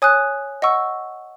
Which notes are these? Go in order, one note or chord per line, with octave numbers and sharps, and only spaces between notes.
C#5 G#5 D#6 F#6
D#5 F#5 C#6 E6